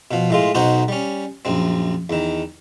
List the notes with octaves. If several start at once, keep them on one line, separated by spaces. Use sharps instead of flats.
B2 F3
A2 G#3 F4
B1 B2 D#4 F#4 C5
G3 C#4
A#1 F#2 C4
E2 D#3